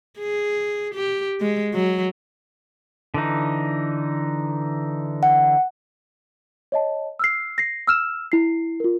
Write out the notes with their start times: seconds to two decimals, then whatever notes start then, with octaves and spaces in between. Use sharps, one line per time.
0.19 G#4
0.95 G4
1.41 G#3
1.74 F#3
3.14 D3 E3 D#4
5.23 F#5
6.72 C#5 D#5 A5
7.19 E6 F6 C7
7.58 A#6 C7
7.87 E6 F6 E7
8.32 E4 C7
8.80 F4 A#4